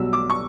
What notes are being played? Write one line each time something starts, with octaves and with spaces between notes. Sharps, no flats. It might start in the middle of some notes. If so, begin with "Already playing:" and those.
Already playing: B1 B2 G3 E6
D6
C#6